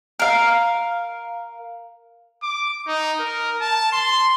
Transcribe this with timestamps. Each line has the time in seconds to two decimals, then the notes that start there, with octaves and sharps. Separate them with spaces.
0.19 A#4 F5
2.43 D6
2.87 D#4
3.20 A#4
3.61 A5
3.92 C6